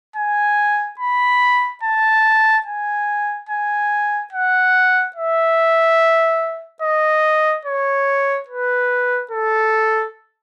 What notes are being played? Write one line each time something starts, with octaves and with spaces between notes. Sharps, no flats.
G#5
B5
A5
G#5
G#5
F#5
E5
D#5
C#5
B4
A4